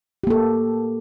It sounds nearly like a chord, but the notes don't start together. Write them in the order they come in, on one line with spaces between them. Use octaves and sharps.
G4 A#3 A4